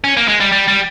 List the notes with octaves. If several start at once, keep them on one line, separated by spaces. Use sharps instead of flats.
C#4
A#3
G#3
G3
G3
G3